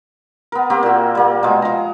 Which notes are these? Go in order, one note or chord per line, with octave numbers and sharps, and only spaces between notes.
B3 A#4
A#3 C4 G4
A#2 F#4
G3 A#3
B2 G#3
F3 A#5